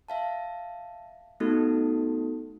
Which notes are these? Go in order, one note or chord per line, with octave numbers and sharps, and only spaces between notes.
E5 F5 A5
A3 B3 D#4 F#4 A4